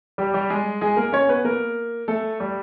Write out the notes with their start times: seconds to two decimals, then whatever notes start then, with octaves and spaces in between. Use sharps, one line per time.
0.18 G3 G4
0.34 G3 G4
0.50 G#3 G#4
0.81 G#3 G#4
0.97 A#3 A#4
1.13 C#4 C#5
1.29 B3 B4
1.44 A#3 A#4
2.08 A3 A4
2.40 G3 G4